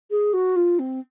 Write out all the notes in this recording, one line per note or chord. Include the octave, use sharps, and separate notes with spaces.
G#4
F#4
F4
C4